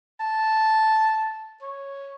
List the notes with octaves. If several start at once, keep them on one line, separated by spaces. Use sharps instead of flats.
A5
C#5